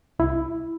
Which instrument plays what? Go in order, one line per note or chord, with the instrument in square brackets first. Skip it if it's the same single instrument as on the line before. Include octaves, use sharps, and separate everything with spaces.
[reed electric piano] C2 E4